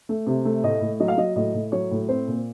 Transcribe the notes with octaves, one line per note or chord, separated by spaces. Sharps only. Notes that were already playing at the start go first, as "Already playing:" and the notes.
A3
C3
A3
A2 D#5
A2
F#3 D#5
F5
F#3 D#5
A2 D#5
A2
F#3 C#5
A2
C4 C5
A#2